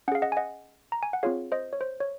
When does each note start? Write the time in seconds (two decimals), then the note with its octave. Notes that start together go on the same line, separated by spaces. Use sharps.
0.08 C#4 F#5
0.12 G#4 F5
0.22 D#5 F#5
0.32 G#5
0.37 D#5 F#5
0.92 A#5
1.03 G#5
1.13 F#5
1.23 C4 F4 G#4 C#5 F5
1.52 C5 D#5
1.73 C#5
1.81 C5
2.00 C#5